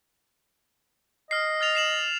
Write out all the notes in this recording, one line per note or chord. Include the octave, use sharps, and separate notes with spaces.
D#5 F6 C7
F6 A6 F7
C7 E7 F#7